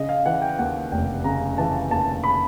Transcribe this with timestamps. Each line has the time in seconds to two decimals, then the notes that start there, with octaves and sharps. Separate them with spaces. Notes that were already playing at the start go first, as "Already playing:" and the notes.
Already playing: C#3 D#5
0.09 F5
0.26 E3 F#5
0.42 G5
0.59 D#2 F#5
0.92 F1 G5
1.24 C#3 A#5
1.58 E3 A5
1.91 D#2 A5
2.24 B5